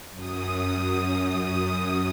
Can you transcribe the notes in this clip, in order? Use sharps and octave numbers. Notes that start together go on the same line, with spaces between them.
F#2 D#6